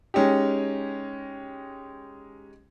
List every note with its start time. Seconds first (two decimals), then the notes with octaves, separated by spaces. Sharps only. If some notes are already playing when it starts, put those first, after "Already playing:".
0.14 G#3 C#4 D#4 G4